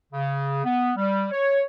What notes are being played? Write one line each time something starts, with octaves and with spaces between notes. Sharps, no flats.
C#3
B3
G3
C#5